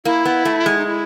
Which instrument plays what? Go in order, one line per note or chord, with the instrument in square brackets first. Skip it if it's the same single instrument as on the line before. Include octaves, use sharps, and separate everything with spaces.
[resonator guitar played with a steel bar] A#3 [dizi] E4
[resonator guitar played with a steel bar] B3
A3
G#3
[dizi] D#4
E4